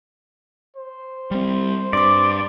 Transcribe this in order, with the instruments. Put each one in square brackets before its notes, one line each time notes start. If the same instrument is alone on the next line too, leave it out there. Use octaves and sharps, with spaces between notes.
[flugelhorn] C5
[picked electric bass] G3 C4
[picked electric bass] G2 [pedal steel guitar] D5 [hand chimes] C6 D6